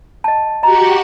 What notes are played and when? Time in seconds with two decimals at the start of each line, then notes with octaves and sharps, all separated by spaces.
0.24 D#5 A5
0.63 F#4 G4 D#5 F#5 A#5